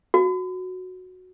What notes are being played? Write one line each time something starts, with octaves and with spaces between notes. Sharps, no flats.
F#4